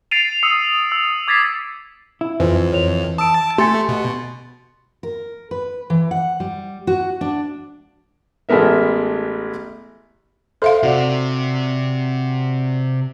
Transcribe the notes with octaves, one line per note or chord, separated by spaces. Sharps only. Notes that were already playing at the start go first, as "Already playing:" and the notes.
A6 C7 D7 D#7 F7
D#6 E6 C#7
E6
D6 G#6 A6 B6 C7
E4
F2 E3 F4 C5
C#5 F7
A5 D#6 E6 D7
A3 G4 G#5 C6 A6 C#7
B2
A#4
B4
E3
F#5
G3
F#4
D4
A1 G#3 A3 B3 A#4 E5
A4 C5 E5 F5
C3 F#4 D5